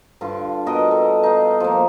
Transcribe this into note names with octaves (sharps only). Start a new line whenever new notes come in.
G2 D3 F4 A5
B2 G4 A#4 D#5
A4
D#4 F5
F3 A#3